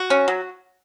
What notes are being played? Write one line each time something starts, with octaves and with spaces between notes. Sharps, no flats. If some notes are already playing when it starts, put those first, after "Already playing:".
Already playing: F#4
C#4
F#3